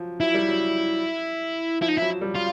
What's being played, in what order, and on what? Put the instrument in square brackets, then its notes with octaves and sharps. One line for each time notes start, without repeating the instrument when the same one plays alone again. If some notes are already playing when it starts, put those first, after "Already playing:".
Already playing: [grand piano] F3 F#3
[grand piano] F#3 [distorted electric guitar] E4
[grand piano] G3
F#3
[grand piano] F3 [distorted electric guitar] E4
[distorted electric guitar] D#4
E4
[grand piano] F#3
G3
[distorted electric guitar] F4